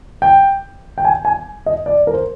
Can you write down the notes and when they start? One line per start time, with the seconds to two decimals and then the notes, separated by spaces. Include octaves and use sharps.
0.22 G5
0.98 G5
1.05 G#5
1.25 G#5
1.66 D#5
1.86 D5
2.07 A#4
2.14 C5